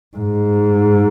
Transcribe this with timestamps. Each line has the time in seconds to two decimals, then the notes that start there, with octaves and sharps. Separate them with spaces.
0.17 G#2